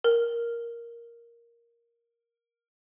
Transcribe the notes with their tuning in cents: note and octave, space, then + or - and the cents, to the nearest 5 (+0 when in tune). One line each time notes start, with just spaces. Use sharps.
A#4 +5